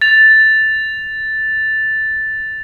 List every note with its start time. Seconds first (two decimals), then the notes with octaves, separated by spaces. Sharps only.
0.02 A6 F7